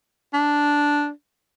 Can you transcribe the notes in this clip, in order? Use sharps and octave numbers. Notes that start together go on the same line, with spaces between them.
D4